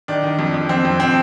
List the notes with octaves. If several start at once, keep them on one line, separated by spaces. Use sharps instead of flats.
D#3 D4
D#3
F2
F2
F2 C4
F2
C4